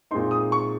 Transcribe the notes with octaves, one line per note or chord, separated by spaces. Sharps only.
A#2 G#3 C4 D#4 C6
D#6
C#6